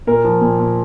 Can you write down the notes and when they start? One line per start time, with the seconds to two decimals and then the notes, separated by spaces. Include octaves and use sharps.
0.07 A#2 A#4
0.24 F3
0.41 A#2
0.58 A#2